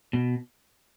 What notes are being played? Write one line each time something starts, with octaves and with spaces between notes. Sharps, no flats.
B2